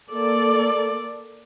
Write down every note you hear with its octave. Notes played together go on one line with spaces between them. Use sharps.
A#3 A4 D5